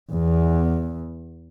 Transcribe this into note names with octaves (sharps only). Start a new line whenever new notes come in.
E2